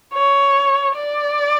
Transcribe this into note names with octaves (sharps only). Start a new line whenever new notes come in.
C#5
D5